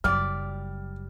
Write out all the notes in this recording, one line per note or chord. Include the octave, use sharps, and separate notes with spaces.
F#1 F#3 G3 D5 F6